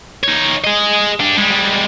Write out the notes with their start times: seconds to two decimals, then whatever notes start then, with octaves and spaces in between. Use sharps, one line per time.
0.24 D#4 C#5
0.64 G#4 D#5
1.20 D4 G4
1.37 G3 G#3